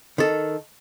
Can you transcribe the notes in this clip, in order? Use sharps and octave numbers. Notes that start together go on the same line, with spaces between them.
D#3 A4